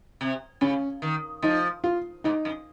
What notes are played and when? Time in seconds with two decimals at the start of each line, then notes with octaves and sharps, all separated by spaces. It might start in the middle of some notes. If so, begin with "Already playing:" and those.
0.21 C3
0.61 C#3 C#4
1.02 D#3
1.42 F3 D#4
1.84 F4
2.24 G#2 D#4
2.45 F#2